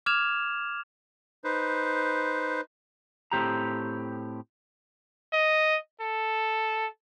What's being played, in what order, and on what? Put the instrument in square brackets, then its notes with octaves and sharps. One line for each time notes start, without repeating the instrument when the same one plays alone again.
[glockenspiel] D6 F6 G#6 E7 F7
[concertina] D#4 B4 C5
[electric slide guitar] A2 C4 G4 A#5
[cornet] D#5
A4